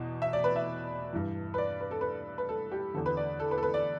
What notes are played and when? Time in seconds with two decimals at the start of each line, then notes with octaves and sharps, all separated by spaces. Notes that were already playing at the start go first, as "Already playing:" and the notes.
Already playing: E2 B2
0.22 E5
0.33 D5
0.44 B4
0.56 E5
1.13 G2 E3
1.54 B4
1.58 D5
1.81 B4
1.91 A4
2.01 B4
2.38 B4
2.49 A4
2.72 G4
2.94 E2 D3 A4
3.06 B4
3.17 D5
3.40 A4
3.51 B4
3.58 A4
3.63 B4
3.74 D5